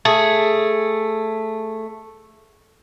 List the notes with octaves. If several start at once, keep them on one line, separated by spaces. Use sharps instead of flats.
A3 G#4